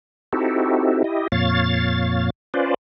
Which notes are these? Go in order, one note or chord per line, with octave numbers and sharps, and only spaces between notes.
C4 D#4 E4 F#4 G4 A4
E4 G4 D#5
F2 A#2 C#5 F5 A6
C#4 F4 B4 C5 D5